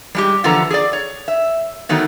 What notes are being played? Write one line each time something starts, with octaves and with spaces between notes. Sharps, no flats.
G3 G#3 G4
D3 E3 F3 B3 A4 A#5
G#4 D5
C#5
E5
D#3 F#3 A3 B3 D#4